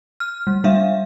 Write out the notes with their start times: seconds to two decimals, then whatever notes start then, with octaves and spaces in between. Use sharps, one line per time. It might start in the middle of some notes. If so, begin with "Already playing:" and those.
0.20 F6
0.47 G3
0.64 G3 D4 E5 F5